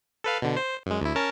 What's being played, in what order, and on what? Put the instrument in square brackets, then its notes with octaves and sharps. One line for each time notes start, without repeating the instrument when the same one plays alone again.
[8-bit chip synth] A4 B4 F5
B2 D3
C5
F#2 G#3
D2 E4
C#4 A#4 A5